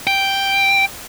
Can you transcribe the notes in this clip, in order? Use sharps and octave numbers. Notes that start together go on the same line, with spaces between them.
G5